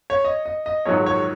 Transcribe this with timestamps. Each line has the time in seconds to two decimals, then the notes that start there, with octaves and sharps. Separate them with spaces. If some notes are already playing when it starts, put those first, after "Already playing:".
0.10 C#5
0.24 D#5
0.46 D#5
0.66 D#5
0.85 A#1 G#2 D#3 F#3 C#5
1.06 C#5